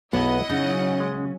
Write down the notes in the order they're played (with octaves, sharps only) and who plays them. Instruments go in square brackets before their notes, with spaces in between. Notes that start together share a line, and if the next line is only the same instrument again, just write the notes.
[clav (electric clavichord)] B1 G#4 A5 [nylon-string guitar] B3 [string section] E4 D#5 F#5
[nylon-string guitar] C#3 [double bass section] F#3 C#4 [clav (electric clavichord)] D#4
[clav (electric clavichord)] G#3